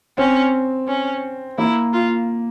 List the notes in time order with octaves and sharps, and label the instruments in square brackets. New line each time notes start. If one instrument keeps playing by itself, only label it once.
[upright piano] C4 [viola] C#4
[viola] C#4
[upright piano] A#3 [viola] E4
[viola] F4